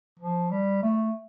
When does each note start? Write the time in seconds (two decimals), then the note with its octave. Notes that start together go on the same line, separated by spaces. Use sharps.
0.20 F3
0.51 G3
0.83 A3